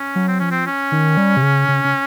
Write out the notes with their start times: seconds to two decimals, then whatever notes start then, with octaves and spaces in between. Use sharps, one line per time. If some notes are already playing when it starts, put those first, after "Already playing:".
Already playing: C#4
0.16 F#3
0.28 C4
0.40 F3 C#4
0.51 C4
0.67 C#4
0.92 D#3
1.17 G3
1.37 C3
1.42 C#3
1.68 C#3
1.84 C#3